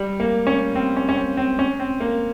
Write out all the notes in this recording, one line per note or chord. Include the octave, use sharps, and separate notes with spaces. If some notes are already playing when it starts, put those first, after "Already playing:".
Already playing: G3
A#3
C#4
C4
C#4
C#4
C4
C4
C#4
C4
A#3